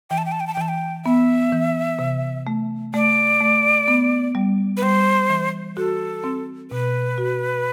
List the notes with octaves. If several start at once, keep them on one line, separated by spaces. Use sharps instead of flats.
E3 G5
A5
G5
A5
G5
A5
G5
E3 A5
G5
B3 E5
E3
C3
A3
A3 D5
A3
B3
G3
B4
G3 C5
E3
F#4 A4
C4
B2 B4
F#4